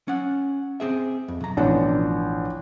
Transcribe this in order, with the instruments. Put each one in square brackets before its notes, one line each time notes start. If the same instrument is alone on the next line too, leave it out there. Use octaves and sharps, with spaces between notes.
[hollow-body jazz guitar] C#4 F#5
C4 G#4 E5
F2
B1 A#5
[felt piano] A1 D4 [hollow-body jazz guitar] B2 F3 B3